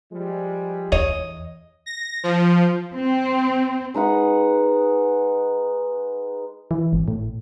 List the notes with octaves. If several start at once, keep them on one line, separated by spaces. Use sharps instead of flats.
F3 G3 G#3
E2 C#5 D#5
A#6
F3
C4
G#3 D#4 B4 F#5
E3
G#1
A2